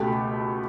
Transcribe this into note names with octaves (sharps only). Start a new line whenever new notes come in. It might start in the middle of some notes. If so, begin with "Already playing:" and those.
Already playing: C#2 B2 A3 G4 G5